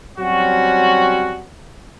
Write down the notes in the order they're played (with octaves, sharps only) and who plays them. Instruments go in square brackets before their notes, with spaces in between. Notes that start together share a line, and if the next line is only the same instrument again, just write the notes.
[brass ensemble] F#3 G3 C4 C#4 F#4